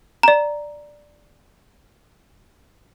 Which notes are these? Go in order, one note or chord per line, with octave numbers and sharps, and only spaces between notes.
D5 A#5